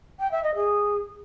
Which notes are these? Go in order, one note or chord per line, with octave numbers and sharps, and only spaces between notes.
G5
E5
D#5
G#4